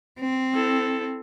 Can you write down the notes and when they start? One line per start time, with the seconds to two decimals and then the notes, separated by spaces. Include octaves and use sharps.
0.20 C4
0.54 E4 A4